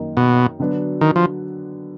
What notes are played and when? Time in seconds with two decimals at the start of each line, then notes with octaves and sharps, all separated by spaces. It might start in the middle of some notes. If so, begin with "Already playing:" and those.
Already playing: F#2 D#3 A#3 D#4
0.17 B2
0.60 D3 F#3 B3 D4 F#4
1.01 D#3
1.16 F3